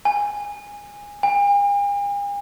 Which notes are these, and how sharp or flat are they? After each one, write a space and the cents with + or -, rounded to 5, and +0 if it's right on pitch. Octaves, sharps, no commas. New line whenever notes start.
G#5 -15
G#5 -45